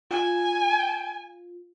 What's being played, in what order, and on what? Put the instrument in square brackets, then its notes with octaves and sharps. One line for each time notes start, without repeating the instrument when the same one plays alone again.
[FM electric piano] F4 [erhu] G#5